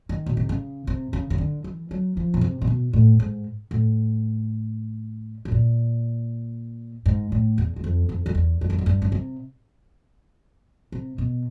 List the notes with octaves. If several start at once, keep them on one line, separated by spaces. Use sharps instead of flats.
D#3
B2
C3
C#3
C3
C#3
C#3
D3
E3
F#3
F3
B2
C3
C3
B2
A2
G#2
A2
A2
A#2
G#2
A2
E2
E2
F2
F2
F2
E2
F2
F#2
F2
G2
C#3
C3
C3
B2